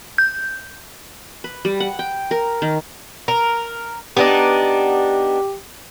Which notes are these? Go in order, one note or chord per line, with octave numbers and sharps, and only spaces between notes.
G6
B4
G3
F#5
G5
A#4
D#3
A#4
B3 D4 D#4 G4